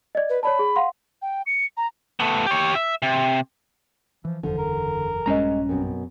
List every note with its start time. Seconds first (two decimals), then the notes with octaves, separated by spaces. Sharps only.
0.15 D5 D#5
0.29 B4
0.43 C#5 D5 A5 B5
0.59 G#4
0.76 F5 F#5 C6
1.22 G5
1.46 C#7
1.77 A#5
2.20 A3 B3
2.47 G4 C#5
2.75 E5
3.02 C3
4.25 E3 F3
4.43 F#1 E2 D3 F3
4.58 A#4
5.26 A#1 G2 G#3 C#4 D#5 A#5
5.69 F#2 B2 C4